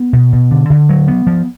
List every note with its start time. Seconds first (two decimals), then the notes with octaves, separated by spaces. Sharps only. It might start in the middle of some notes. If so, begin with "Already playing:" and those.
Already playing: B3
0.13 B2
0.33 B2
0.51 D3
0.70 D3
0.89 F#3
1.08 B3
1.27 F3